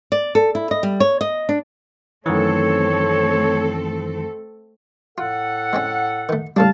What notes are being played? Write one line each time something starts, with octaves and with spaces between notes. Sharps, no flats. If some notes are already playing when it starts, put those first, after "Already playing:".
D5
A4
E4
D#5
G3
C#5
D#5
D4
F#2 D#3 E3 A3 C4 A4 C#5
A2 F4 A4 F#5
G#3 C4 C#4
D#3 A3
A2 C#3 G3 D4 F5 A5